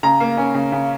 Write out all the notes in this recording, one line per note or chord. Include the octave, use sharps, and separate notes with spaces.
C#3 A#5
A#3
C#4
C#3
C#3